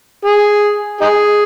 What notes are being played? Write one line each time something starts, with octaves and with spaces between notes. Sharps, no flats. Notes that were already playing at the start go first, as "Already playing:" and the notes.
G#4
D#4 G#4